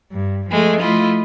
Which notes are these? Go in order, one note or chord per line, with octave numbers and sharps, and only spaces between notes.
G2
F3 G#3 A3
F3 A3 E4 F4 D#5